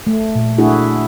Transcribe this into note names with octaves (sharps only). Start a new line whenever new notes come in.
A3
A#2
A3 D4 E4 F#4 G#4